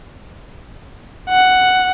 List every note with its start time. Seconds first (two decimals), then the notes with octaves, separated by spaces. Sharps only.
1.29 F#5